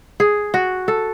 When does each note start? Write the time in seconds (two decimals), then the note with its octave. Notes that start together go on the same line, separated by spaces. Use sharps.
0.20 G#4
0.54 F#4
0.88 A4